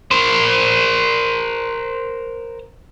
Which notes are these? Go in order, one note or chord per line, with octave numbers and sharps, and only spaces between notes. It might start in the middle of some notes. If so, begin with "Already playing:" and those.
A#4 C5